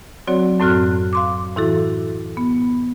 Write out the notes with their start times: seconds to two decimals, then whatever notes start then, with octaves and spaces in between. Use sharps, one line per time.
0.28 F#3 C4 F#4 C#5 D5
0.60 F#2 A2 C4 F#4 F6 F#6
1.13 F5 C6 D6
1.56 A2 E3 E4 F#4 A4
2.37 B3